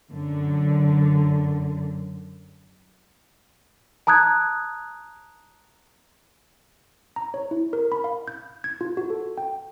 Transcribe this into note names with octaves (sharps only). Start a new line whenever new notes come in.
F#2 D3
A5 A#5 D#6 F#6 G#6
A#5
C#5
E4
A#4
B5
F5
G6
G#6
F4
F#4
A4
G5